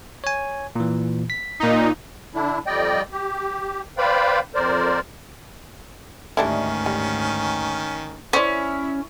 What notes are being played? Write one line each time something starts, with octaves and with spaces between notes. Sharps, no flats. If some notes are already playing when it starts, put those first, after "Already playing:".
C#5 G#5
A#2 E3
B6
A#2 D#4
D3 D4 E4
F2 G3 D5 D#5 G5
G4
B4 C5 D5 F5 G5 B5
F2 A#4 C5 D5
D2 G#2 D#3 G3 C#4 D4 E4
G3
C#4 E4 C5 D5